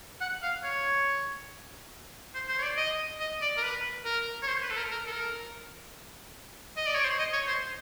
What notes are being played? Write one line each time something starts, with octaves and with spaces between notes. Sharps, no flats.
F#5
F5
C#5
C5
C5
C#5
D5
D#5
D#5
D5
A#4
B4
A#4
C#5
C5
B4
A4
A#4
A#4
A4
A#4
D#5
D5
C#5
C5
D#5
C#5
C5